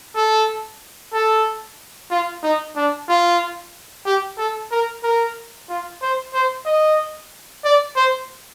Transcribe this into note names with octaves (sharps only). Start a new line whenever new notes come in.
A4
A4
F4
D#4
D4
F4
G4
A4
A#4
A#4
F4
C5
C5
D#5
D5
C5